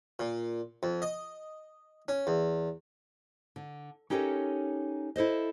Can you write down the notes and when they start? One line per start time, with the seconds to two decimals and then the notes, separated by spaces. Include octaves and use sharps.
0.19 A#2
0.83 F2
1.02 D#5
2.08 C#4
2.27 E2
3.56 D3
4.10 C#4 D#4 G4 A4 A#4 C#5
5.16 E4 A4 C5 D#5